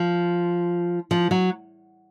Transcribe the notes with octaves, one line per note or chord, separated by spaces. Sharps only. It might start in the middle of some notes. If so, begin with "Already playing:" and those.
Already playing: F3
F3
F#3